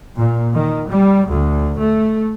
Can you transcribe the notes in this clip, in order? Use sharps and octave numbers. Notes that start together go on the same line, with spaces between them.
A#2
D#3
G3
D2
A3